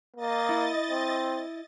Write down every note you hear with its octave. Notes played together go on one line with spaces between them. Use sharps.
A#3 D#5 A6
E4
C4